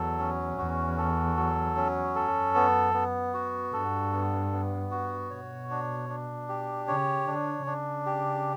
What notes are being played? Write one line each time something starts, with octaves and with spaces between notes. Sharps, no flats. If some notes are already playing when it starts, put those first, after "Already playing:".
Already playing: E2 F#3 A4
C#4
E2 F#4
A4
F#3
C#4
F#2 A4
B3
B3
F#4
G2 A4
B3
B3
F#4
B2 C#5
D4
D4
G4
C#3 C#5
D3 D4
C#3 D4
G4